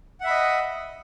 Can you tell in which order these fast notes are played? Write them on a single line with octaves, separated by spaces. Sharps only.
F#5 E5 B5 D#5